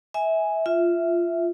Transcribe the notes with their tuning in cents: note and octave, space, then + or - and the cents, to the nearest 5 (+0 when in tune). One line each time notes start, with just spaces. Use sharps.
E5 -25 G#5 +0
F4 -10 E5 +0